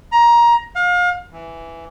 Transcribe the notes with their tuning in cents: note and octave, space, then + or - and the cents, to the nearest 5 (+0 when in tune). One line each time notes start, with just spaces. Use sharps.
A#5 +20
F5 +35
E3 +5